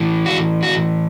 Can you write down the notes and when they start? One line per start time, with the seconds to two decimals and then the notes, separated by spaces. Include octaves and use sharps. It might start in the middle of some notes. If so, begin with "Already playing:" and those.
Already playing: A2 E3
0.26 F#4
0.63 F#4